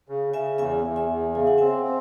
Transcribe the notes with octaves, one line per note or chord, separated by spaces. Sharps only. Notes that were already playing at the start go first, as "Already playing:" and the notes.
C#3
C#3 E5 G#5
E2 E5 G#5
E2
E5 G#5
E2
C#3 G#5
F#5
C4 E5 G#5
C4